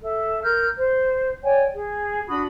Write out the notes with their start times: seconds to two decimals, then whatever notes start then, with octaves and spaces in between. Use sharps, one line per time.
0.01 A4 E5
0.43 A#4 F6 G6
0.78 C5
1.43 C#5 D5 G5 G#5
1.74 G#4
2.28 D4 F#4 B5 D#6